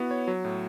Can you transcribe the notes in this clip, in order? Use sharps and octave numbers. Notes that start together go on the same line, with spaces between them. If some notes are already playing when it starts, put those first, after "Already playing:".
Already playing: B3 E4 F#4
C#5
F#3
A2